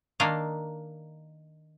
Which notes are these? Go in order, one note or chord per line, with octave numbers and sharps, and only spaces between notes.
D#3 A#3 D4 D#5 F5